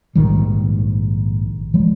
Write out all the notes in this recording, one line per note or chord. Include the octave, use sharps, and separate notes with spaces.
A#1 G#2 D#3 G3
F3 G#3